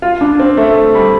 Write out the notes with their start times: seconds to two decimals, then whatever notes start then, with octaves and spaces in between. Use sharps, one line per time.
0.02 F4
0.21 D4
0.40 C4
0.57 A3
0.95 G3